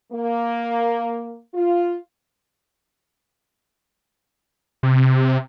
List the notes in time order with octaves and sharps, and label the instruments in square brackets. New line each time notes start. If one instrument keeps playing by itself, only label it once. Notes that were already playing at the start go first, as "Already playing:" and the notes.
[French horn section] A#3
F4
[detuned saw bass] C3